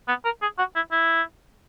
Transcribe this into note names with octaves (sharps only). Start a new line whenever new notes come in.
B3
A#4
G#4
F#4
E4
E4